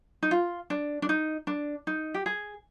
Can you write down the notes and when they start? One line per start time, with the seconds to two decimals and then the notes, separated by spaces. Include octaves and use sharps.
0.23 D#4
0.31 F4
0.70 D4
1.02 D4
1.09 D#4
1.47 D4
1.87 D#4
2.14 G4
2.26 G#4